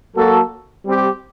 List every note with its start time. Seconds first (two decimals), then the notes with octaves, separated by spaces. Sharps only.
0.16 F#3 A#3 F#4 A4
0.85 G3 C4 G4